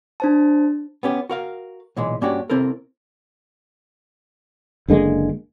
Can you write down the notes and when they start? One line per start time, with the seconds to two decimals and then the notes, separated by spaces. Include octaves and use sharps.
0.20 D4 C5 A5
1.03 B3 C#4 G4
1.30 F#4 A#4 F5
1.96 B1 A#2 E3 G#3
2.21 G2 A#3 C#4 D4 F#4 G4
2.50 C3 C4 E4 A4 A#4
4.88 F#1 D3 G#3 A#3